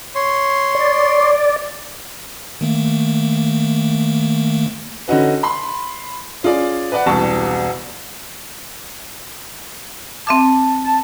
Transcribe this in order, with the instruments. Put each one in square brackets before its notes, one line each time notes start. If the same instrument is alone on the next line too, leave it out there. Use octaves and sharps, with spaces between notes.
[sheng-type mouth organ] C#5 C6
[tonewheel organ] D5
[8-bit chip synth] D#3 A3 A#3
[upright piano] D3 C#4 D#4 F#4 B4
B5 C6
C#4 F4 G#4 D5
B4 D5 F#5
E1 C2 G3 A5 C#6
[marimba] C4 E5 D6 [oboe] A5
[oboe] A5